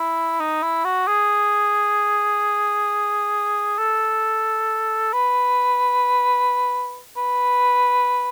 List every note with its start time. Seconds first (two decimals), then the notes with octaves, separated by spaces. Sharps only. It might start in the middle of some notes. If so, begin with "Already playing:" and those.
Already playing: E4
0.40 D#4
0.63 E4
0.85 F#4
1.07 G#4
3.78 A4
5.13 B4
7.17 B4